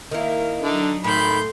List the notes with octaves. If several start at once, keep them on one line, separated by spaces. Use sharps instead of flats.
D#3 A#3 E4
D3 F#3 D4 D#4
A2 D#3 B5 C6 G6